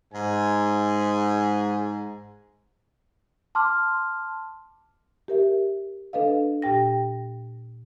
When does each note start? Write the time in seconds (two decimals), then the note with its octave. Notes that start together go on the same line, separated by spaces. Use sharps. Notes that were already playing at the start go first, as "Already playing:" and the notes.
0.13 G#2 G#5
3.55 A5 C6 D6 F6
5.28 G4 A#4 E5
6.13 D4 A4 B4 D#5 F5
6.62 A#2 G4 G5 A#6